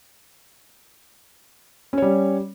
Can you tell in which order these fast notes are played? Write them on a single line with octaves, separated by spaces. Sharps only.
C#4 C#5 G3